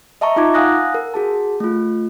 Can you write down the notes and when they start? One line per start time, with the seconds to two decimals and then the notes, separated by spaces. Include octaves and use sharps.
0.21 D#5 E5 A5 A#5 C#6
0.36 D#4 F4 A#5 D6 G#6
0.54 F5 F#5 G#5 D#6 F#6 A#6
0.94 A#4
1.14 F#4 G#4 A5
1.60 A3 F4